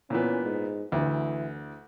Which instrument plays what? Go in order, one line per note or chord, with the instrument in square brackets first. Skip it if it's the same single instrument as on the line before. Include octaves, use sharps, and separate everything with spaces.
[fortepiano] A#2 E3 B3 [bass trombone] C#4
[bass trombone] G#2
[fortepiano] D2 [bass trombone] E3